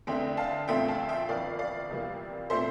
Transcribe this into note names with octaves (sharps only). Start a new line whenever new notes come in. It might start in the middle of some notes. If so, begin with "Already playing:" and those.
E2 D3 A3 C4 E5 G5
F5 A5
A#1 A#2 A3 C4 E5 G5
F5 A5
E5 G5
G1 F2 E3 A#3 D5 F5
D5 F5
F2 C3 E3 G3 A#3
A#2 A3 C4 C5 E5